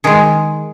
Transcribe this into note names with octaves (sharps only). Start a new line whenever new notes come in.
D#3 G#3 G#4